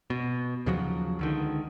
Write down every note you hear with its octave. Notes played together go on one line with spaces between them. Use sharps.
B2
D#2 C#3 F3 F#3
C#2 D3 D#3